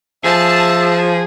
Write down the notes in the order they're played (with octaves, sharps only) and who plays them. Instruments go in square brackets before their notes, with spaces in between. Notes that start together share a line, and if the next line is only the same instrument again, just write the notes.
[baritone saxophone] F3 [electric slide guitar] G#4 [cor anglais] E5 [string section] A5